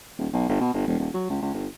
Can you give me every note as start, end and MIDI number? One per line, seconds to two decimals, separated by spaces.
0.18 0.27 27
0.33 0.44 35
0.49 0.58 31
0.60 0.70 47
0.73 0.86 31
0.87 0.95 28
0.99 1.09 27
1.14 1.28 54
1.29 1.40 37
1.42 1.52 37
1.54 1.67 31